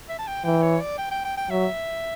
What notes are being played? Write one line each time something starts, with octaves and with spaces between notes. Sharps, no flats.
E5
A5
G5
E3 G5
C#5
D5
G5
G5
G5
G5
F#3 E5